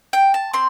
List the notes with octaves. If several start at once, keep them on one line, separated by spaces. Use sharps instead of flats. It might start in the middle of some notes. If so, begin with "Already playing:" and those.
G5
A5
C4 C6